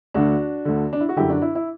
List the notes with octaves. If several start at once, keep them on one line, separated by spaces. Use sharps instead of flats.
D2 D3 D4 F#4
D2 D3
D4
E4
F#4
F#2 D3 E4 G4
D4 F#4
E4
E4